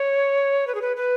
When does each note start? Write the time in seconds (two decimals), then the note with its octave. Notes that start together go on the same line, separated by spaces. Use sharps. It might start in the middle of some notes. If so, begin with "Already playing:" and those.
Already playing: C#5
0.67 B4
0.75 G#4
0.82 B4
0.97 B4